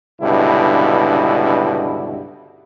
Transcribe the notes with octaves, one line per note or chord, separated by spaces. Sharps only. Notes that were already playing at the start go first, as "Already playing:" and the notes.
C#2 G2 B2 D3 E4